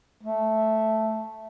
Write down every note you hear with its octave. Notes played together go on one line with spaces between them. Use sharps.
A3